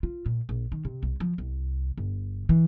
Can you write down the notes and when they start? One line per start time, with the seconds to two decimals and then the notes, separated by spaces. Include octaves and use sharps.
0.03 F4
0.26 A#2
0.49 A#1
0.72 D#3
0.85 C3
1.03 C2
1.20 F3
1.38 C2
1.97 G1
2.49 E3